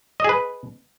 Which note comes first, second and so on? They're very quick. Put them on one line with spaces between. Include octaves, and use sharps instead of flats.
D#5 G#4 B4